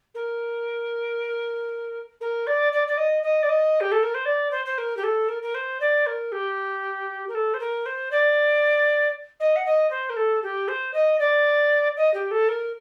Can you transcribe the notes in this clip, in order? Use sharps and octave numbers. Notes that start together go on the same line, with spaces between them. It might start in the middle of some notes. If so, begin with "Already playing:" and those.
A#4
A#4
D5
D5
D5
D#5
D#5
D5
D#5
G4
A4
A#4
C5
D5
C5
C5
A#4
G4
A4
A#4
A#4
C5
D5
A#4
G4
A#4
A4
C5
A#4
C5
D5
D#5
F#5
D#5
C5
A#4
A4
G4
C5
D#5
D5
D#5
G4
A4
A#4